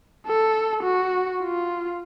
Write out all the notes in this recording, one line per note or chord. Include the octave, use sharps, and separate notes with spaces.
A4
F#4
F4